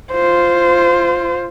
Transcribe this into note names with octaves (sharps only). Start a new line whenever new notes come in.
F4 C5